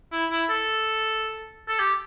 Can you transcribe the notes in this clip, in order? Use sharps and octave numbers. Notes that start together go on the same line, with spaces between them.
E4
E4
A4
A4
G4